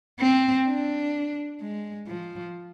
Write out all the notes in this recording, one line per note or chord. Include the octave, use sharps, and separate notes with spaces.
C4
D4
G#3
F3